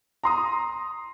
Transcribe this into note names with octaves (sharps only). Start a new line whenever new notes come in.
A#5 C6 D#6